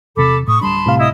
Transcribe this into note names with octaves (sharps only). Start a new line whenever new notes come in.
E2 C3 A4 B5 D6
A2 C#6 D#6
D1 G3 D4 A5 B5 C6
A2 C3 F5
E4 D#5 D#6